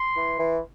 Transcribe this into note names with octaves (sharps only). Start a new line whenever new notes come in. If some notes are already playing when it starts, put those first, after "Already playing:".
Already playing: C6
E3
E3